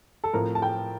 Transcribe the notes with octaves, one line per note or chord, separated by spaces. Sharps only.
A4
A2 F3 A3 C4 A#4
A5
G5